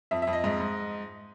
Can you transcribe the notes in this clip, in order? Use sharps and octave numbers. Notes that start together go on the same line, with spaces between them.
F2 E5
E5
F2
D#5
G#2 D#5
G#2